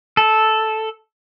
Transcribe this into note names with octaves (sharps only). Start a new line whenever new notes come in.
A4